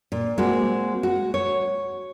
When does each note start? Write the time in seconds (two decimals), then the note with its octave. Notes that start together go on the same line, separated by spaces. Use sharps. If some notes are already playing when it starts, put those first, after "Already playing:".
0.12 A#2
0.38 G#3 A#3 C4 F#4
1.03 F#4
1.34 C#5